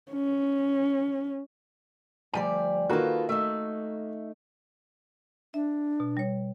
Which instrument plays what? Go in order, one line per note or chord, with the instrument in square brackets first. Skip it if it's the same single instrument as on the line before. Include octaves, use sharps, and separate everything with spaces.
[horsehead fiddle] C#4
[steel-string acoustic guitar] D2 G3 D5 [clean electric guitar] F3 G4 G#5
[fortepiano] D#3 A#3 F#4 [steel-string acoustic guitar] F4 A4 [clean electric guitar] B4
[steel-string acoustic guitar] A3 D#4 [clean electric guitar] E5
[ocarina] D4 [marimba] E5
[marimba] B2
G3 C#5